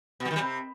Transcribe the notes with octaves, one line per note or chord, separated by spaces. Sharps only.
B2
G3
D#3
G3
C3